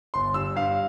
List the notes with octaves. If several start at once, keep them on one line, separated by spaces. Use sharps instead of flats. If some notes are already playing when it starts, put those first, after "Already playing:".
G1 C6
G2 E6
G2 F5